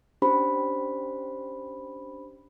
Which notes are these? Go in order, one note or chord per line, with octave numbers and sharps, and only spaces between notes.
C#4 D4 G4 C5 B5